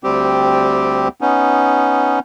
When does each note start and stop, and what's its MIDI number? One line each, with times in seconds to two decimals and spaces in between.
0.04 1.08 38
0.04 1.08 55
0.04 1.08 60
0.04 1.08 67
1.21 2.19 59
1.21 2.19 61
1.21 2.19 63